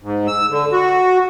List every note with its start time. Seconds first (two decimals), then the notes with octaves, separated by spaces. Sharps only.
0.03 G#2
0.27 E6
0.50 D3
0.72 F#4